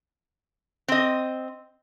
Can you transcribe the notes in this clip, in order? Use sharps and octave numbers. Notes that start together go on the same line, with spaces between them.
C4 D#5